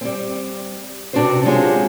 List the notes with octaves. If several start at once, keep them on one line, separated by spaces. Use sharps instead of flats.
G3 C4
C3 D#3 D4 F#4 B4 C5
F#3 G#3 C4 F4 G4